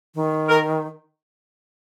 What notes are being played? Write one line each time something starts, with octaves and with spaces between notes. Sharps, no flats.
D#3
A#4